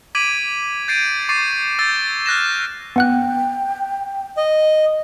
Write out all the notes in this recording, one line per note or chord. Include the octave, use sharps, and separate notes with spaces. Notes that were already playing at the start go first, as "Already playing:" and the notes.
D6 G#6 B6 D7 D#7 F#7
G6 A6 C7 D7 D#7
C#6 D6 G#6 A6 C7 D#7
E6 G6 A6
F6 F#6 A#6 E7
B3 F#5 G5 F#6
D#5